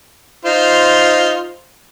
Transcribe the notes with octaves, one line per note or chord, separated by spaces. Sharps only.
D#4 F4 C5